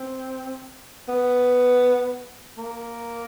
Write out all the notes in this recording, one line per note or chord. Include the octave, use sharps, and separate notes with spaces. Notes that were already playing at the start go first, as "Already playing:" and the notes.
Already playing: C4
B3
A#3